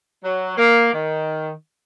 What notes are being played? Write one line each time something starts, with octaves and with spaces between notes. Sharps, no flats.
F#3
A#3
D#3